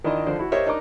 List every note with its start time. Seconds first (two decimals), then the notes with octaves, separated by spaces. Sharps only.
0.04 D#3 D4 E4 F4 D#5
0.26 D3 F3 C5 D5
0.39 E4 F#4
0.52 G4 A#4 C5 C#5 D#5 E5
0.66 D4 D#4 A#4 D#5 D6